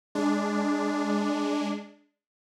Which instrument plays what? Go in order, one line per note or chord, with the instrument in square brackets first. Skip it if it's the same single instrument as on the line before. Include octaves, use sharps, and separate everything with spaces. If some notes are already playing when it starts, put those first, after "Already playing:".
[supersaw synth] G#3 D4